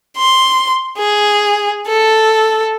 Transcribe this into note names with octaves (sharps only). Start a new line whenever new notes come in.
C6
G#4
A4